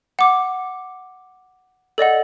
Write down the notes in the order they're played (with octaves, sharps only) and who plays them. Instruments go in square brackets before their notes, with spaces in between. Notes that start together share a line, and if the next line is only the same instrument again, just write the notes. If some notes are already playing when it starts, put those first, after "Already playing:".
[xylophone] F#5 D6
A4 D5 D#5 F#5